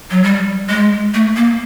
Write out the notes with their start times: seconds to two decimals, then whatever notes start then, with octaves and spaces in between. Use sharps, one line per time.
0.11 F#3
0.23 G3
0.69 G#3
1.14 A3
1.36 A#3